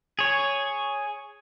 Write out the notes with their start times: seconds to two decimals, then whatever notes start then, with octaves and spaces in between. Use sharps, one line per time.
0.19 G#4 C#5